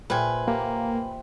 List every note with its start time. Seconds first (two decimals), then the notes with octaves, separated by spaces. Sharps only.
0.10 A#2 G#4 B4 C5 E5 G5 G#5
0.48 A#3 G4